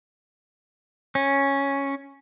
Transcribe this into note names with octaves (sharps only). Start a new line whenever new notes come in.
C#4